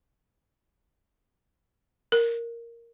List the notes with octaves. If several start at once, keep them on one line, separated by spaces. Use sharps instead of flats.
A#4